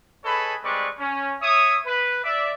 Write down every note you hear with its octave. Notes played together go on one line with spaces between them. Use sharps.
G#4 A4 B4 C#5 D#5 B5
G3 G#3 C4 B4 D5 C#6
C#4
C#5 E5 D#6
B4
D5 E5